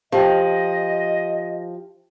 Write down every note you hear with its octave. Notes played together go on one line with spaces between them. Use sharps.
F3 G4 D#5 G5